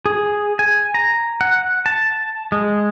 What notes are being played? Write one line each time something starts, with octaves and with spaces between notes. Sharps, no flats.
G#4
G#5
A#5
F#5
A5
G#3